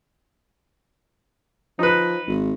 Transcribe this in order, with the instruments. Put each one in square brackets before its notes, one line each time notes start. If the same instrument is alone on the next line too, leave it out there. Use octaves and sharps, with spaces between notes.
[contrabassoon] F3 [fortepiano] D#4 B4
[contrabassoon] G#1